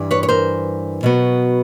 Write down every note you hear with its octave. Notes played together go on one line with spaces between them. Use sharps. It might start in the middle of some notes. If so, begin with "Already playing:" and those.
Already playing: G2 E3 G3
B4 C#5
C#5
A#4 C5
B2 F#3 B3